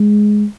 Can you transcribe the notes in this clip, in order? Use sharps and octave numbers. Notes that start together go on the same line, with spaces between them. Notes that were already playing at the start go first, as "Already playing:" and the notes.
Already playing: G#3